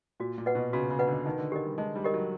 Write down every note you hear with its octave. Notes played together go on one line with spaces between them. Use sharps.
A#2 F#4
A#2
B4 D#5 F#5
B2
C#3 F#4
C#3
B4 D#5 F#5
D3
D#3 D#4
D3
D#3 G4 A#4 D#5
G3
G#3 D#4
G3
G4 A#4 D#5
F#3